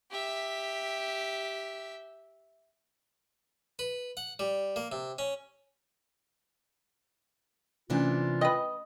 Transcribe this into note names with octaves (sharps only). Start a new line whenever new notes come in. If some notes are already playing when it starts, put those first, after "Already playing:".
G4 E5
B4
F#5
G3
A#3
C3
C#4
C3 E3 A3 C#4 D4 F4
B4 D#5 G5